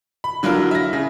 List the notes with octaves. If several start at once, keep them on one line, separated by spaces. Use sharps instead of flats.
B5
D3 F#3 E4 F4 A#4
E5 A#6
C#3